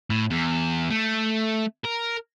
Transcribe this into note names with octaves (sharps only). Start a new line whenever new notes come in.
A2
E2
A3
A#4